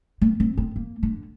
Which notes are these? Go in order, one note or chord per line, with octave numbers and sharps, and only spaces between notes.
A#3
C4
C4
A#3
D3